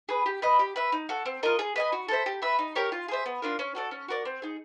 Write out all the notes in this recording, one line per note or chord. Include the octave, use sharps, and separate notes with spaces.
G#4 B4
G4
B4 D#5
G4
B4 E5
D#4
F#4 A4
C4
F4 A#4 D#5
G#4
B4 D#5 G#5
F#4
A4 C5 E5
G4
B4 E5
D#4
G4 A#4 C#5
F4
G#4 C5 E5
B3
D4 F4 A#4
C#4
F#4 A4 D5
C#4
F#4 A#4 D5
C4
D#4 G#4